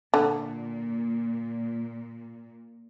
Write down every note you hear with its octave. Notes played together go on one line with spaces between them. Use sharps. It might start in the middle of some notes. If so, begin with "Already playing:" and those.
A#2 D3